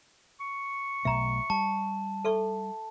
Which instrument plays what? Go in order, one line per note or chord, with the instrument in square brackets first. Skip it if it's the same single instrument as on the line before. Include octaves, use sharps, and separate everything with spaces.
[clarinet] C#6
[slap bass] B1 B2 A3 [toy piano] E5 A#5
[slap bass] G3 [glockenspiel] A5
[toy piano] A4 E5 C#6